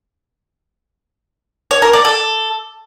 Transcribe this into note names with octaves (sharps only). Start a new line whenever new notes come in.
C#5
A#4
D5
A4